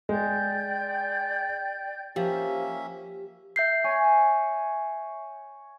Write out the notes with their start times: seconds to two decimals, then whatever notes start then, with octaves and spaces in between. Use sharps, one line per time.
0.09 G#3 D5 G5 G6
2.16 F3 A#3 C#4 G4 E5
3.56 E5 G6 C7
3.84 C#5 G#5